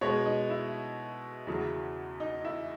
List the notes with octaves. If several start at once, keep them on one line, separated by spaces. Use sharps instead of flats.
B2 G#3 C#5
D#4
E4
E2 C#3 F#3
D#4
E4